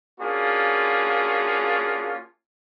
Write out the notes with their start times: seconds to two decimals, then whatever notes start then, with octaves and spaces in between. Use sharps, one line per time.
0.21 A#3 C#4 D4 F4 F#4 G#4